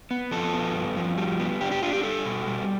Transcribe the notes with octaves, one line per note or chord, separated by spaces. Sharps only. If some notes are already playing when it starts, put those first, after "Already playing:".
B3
F3 A4
B3
G2
F3
G3
B3
D4 G4
G4
D4 F4
G4
G3 A4
B2
G3